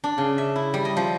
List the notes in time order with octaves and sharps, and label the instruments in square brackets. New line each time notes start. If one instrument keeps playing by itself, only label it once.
[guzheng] D4
C#3
E5
E4
G3
D#5
F3